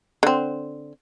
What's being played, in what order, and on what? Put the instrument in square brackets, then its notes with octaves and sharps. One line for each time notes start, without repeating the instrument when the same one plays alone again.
[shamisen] D3 C4